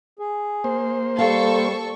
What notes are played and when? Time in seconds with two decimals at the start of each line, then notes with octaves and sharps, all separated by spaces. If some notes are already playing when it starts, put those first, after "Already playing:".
0.19 G#4
0.64 A#3 C5
1.18 G3 A4 F5 C#6